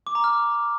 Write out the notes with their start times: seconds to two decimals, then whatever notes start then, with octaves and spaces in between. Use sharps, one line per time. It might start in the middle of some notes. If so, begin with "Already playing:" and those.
0.07 D6
0.15 A#5
0.24 F6